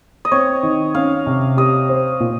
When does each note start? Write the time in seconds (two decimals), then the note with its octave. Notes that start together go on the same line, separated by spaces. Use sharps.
0.25 D#5
0.32 C4 C#5
0.63 D#3
0.95 C#4 F5
1.27 C3
1.57 G4 D#5
1.89 C5
2.20 A#2